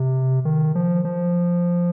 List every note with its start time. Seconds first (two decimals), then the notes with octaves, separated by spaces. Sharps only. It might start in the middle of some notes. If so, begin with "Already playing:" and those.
Already playing: C3
0.45 D#3
0.75 F3
1.05 F3